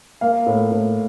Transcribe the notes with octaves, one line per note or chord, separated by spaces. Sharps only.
A#3 F5
A2
A2